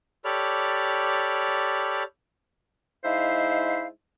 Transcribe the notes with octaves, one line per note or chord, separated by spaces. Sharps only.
G4 A4 C#5 D5 B5 F6
G#3 D#4 E4 C5 E5 F5